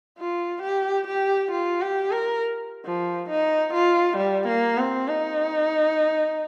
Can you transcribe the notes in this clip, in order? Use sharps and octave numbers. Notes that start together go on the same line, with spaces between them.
F4
G4
G4
F4
G4
A#4
F3
D#4
F4
G3
A#3
C4
D#4